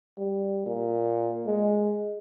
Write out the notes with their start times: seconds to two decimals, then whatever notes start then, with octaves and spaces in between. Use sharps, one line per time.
0.18 G3
0.66 A#2
1.46 G#3